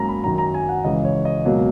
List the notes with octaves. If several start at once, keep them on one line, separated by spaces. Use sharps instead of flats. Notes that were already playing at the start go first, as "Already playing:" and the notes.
Already playing: G#2 F#3 A#3 C#4 A#5
B5
F#2 D#3 F#3 A#5
A#5
G#5
F#5
C#2 C#3 E3 D#5
C#5
D#5
C#2 B2 F#3 A#3